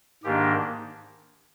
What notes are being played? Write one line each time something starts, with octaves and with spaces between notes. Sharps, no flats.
G#2 D#3 A#3 D4 G4